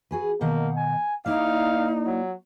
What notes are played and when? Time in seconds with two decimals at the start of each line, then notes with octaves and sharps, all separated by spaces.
0.11 F#4 G#4 B4
0.41 B2 D#3 A#3 F#5
0.76 G#5
1.26 A#3 D#4 E4 D5 F5
2.06 F#3